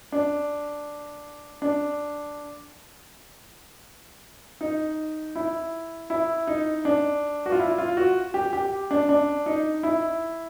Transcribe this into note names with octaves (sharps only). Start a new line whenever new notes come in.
D4
D4
D#4
E4
E4
D#4
D4
F#4
F4
E4
F4
F#4
G4
G4
D4
D4
D#4
E4